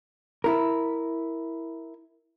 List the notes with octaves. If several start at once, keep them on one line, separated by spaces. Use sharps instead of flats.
E4 A#4